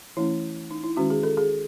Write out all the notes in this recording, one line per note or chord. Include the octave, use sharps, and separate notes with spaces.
E3 A3 C#4 E4
D#4
E4
D#3 G#3 C#4 F#4
G#4
A4
G#4